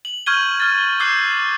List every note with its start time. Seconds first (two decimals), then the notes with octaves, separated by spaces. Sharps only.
0.05 F#7
0.26 C#6 F6 G6 G#6 D#7 G7
0.60 F6 A6
1.00 D6 E6 F#6 G6 C7